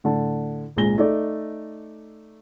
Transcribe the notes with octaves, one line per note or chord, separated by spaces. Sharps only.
A2 D3 A5
G#1 C#2 A#2 G#4 A#6 G7
A3 D#4 D5